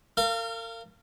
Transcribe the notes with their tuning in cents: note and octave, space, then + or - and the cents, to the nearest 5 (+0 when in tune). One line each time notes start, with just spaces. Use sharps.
A#4 -40 F5 -20